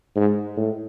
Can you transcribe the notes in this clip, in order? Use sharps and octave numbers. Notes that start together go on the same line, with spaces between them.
G#2
A2